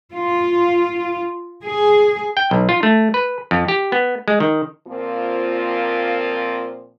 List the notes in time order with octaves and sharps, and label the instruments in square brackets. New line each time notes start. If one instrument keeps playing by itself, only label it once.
[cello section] F4
G#4
[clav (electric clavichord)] G5
B1
F4
A3
B4
F2
G4
B3
G#3
D#3
[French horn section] A#2 F3 A#3 C4 F4